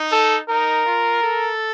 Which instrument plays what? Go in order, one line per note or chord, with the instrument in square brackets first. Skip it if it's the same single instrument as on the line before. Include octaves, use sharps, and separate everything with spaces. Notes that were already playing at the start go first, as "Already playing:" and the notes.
Already playing: [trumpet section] D#4
[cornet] A4
[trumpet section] D#4 [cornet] A#4
[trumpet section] F4
A4